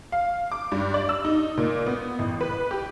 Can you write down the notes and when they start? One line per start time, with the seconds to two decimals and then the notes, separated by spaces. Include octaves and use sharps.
0.12 F5
0.52 D6
0.72 G2
0.94 D5
1.09 E6
1.25 D#4
1.58 A#2
1.86 B3
2.19 A1
2.41 B4
2.71 G4